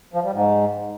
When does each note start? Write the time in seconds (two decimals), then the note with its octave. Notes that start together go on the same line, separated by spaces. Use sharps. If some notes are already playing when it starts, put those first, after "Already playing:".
0.14 F3
0.24 G3
0.33 G#2